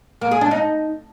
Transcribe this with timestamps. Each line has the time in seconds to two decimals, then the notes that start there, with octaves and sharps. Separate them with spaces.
0.22 A#3
0.31 G#4
0.41 D4
0.51 D#4